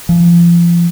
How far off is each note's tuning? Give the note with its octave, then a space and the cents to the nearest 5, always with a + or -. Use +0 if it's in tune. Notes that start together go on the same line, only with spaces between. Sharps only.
F3 -30